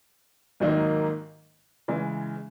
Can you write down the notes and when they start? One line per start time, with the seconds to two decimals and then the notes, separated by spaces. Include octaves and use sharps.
0.60 G#2 D#3 F#3 A#3 D#4
1.88 C#3 E3 G#3